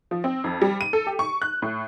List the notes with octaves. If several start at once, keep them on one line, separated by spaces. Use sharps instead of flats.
F3
C4
F2
G3
D#7
A4
G4
C#6
F#6
A2